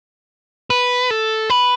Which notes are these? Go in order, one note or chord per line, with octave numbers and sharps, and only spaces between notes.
B4
A4
B4